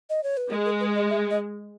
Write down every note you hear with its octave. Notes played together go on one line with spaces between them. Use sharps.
D#5
C#5
B4
G#3 A#4
A#4
B4
D#5
E5
D#5